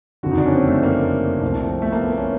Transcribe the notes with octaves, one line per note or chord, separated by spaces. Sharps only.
F#1 F2 D3 F#4
D#4
D4
C#4
C4
A3
A#3
C2 C3 F3 A3
A3
A#3
B3
C#4